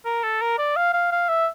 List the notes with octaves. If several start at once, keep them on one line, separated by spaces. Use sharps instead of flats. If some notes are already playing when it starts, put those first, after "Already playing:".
A#4
A4
A#4
D5
F5
F5
F5
E5